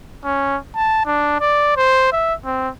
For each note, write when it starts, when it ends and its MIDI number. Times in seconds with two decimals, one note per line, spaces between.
0.25 0.57 61
0.75 1.04 81
1.06 1.39 62
1.41 1.73 74
1.77 2.12 72
2.12 2.34 76
2.46 2.69 60